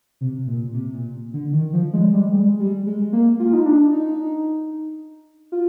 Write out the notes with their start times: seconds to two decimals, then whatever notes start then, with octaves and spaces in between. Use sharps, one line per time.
0.21 C3
0.47 A#2
0.74 C3
0.93 A#2
1.33 D3
1.53 D#3
1.73 F3
1.93 G#3
2.13 G3
2.33 G#3
2.60 G3
2.87 G#3
3.13 A#3
3.40 F4
3.53 D#4
3.66 D4
3.93 D#4
5.52 F4